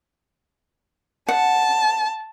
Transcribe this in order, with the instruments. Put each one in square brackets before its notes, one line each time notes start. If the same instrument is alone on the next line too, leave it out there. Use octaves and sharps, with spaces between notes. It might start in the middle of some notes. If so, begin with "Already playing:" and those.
[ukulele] F#5 [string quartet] A5